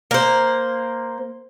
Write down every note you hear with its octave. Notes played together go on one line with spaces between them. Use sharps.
A#3 C5